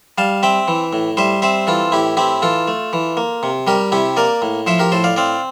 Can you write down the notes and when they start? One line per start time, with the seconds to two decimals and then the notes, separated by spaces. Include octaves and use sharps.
0.18 G3 F5 A5
0.43 C4 E5 G5
0.68 E3
0.93 A2
1.17 G3 C5 E5
1.42 C4 C5 E5
1.67 E3 F4 A4
1.92 A2 E4 G4
2.17 C4 E4 G4
2.42 E3 F4 A4
2.68 A3
2.93 E3
3.17 A#3
3.43 C3
3.67 G3 G4 A#4
3.92 C3 E4 G4
4.17 A#3 A#4 D5
4.42 A2
4.67 F3 C5 E5
4.79 G4 A#4
4.92 A2 A4 C5
5.04 D5 F5
5.16 C4 D5 F5